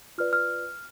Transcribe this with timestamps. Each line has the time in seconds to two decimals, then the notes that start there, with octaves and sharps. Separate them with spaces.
0.18 F4 B4 D5 F6
0.33 F6